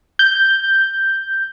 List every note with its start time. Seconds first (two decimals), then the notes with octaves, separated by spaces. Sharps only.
0.19 G6